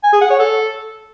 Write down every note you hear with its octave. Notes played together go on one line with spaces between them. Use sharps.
G#5
G#4
F#5
C#5
A4